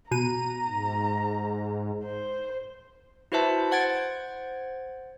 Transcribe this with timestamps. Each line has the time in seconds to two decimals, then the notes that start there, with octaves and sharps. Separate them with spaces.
0.11 B2 A#5 D#7
0.66 G#2
2.04 C5
3.32 E4 F#4 B4 C5 E5 A5
3.72 C5 F#5 G#6 A6 D7